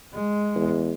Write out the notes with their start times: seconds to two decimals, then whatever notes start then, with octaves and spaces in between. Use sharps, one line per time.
0.13 G#3
0.55 E2